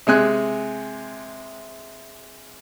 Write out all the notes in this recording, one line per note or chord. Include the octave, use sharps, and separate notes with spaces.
C3 G#3 G#5 F#6